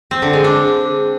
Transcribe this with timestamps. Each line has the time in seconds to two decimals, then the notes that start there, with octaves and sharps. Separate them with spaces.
0.11 C4
0.22 D3
0.33 G#3
0.44 D4